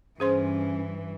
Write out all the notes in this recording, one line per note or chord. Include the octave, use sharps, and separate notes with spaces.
G2 E3 C#4 G#4 C5 C6